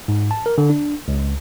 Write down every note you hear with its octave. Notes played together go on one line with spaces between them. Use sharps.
G#2
A5
A#4
D3
D4
C#2